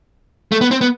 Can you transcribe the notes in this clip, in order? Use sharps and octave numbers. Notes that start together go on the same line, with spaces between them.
A3
B3
C4
B3